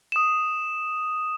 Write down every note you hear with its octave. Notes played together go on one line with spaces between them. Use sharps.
D#6 E7